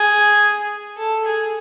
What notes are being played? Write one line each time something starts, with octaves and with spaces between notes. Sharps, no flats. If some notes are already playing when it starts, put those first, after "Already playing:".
Already playing: G#4
A4
G#4